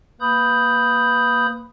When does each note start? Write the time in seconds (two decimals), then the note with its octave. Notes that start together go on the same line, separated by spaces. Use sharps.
0.21 A#3 B4 B5 D#6 G6